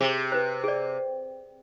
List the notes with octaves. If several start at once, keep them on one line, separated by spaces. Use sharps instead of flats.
C3 G#4
B4 C5
G#4 D5